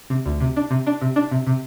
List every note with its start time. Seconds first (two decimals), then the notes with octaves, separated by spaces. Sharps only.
0.10 C3
0.26 D2
0.40 C3
0.56 D4
0.71 C3
0.87 D4
1.01 C3
1.16 D4
1.31 C3
1.47 C3